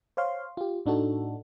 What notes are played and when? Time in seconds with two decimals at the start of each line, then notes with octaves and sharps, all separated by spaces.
0.17 C5 C#5 F5 C6
0.57 F4 G4
0.86 A2 D4 D#4 F#4 A4